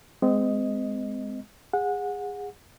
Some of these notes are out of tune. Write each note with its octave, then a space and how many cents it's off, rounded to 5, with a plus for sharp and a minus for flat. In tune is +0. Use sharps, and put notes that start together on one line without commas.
G#3 +0 C4 -30 D#5 +0
G#4 -25 F#5 -25